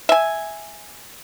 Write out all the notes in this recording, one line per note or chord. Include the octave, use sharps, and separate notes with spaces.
E5 G#5